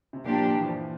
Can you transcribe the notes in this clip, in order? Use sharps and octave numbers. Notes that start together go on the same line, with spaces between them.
C3
A#2 F3 A#3 D4 G4
E3
F3
E3